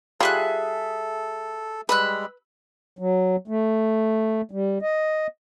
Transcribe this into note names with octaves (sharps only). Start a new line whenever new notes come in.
G3 F4 G#4 A4 E5 F#6
G3 G#3 B4 B5 E6 F#6
F#3
A3
G3
D#5